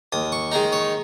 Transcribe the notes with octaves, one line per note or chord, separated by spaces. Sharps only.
D#2 D#6
C#6
D#3 G#3 D#4 A#5
C#5